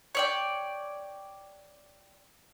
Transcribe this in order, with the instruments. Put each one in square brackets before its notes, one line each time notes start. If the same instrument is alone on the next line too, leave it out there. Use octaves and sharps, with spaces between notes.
[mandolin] C#5 D5 G5